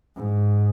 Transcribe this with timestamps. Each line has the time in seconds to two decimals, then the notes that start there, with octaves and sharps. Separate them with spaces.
0.16 G#2